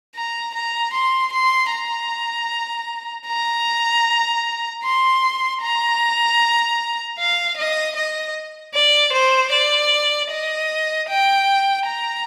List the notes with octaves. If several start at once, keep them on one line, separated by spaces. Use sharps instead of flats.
A#5
A#5
C6
C6
A#5
A#5
C6
A#5
F5
D#5
D#5
D5
C5
D5
D#5
G5
A#5